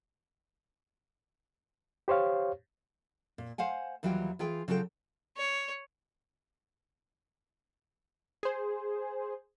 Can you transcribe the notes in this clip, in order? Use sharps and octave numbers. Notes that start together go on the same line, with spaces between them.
G4 C5 C#5 F5
A#2
C5 F5 F#5 G#5
D#2 E3 F#3 G3 F4 G5
E3 F4 G#4 G5
C#3 F#3 F4 A4 A#4 G5
C#5
G#4 C5